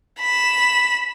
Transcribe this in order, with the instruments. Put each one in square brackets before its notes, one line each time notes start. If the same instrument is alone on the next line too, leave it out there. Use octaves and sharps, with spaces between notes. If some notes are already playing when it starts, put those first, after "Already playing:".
[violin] B5 E7